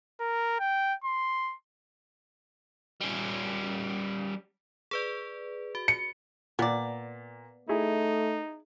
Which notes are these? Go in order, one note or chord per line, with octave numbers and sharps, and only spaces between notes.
A#4
G5
C6
G3 C#4
G#4 B4 D5
F#4
C#7
A#2 B3 D5
A3 D#4 E4 G#4